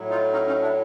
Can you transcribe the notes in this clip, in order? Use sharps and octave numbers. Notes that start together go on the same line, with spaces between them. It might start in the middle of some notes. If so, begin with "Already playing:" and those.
Already playing: A2 F#3
D#4 F4
C#4 D#4
C#4 D#4
D4 E4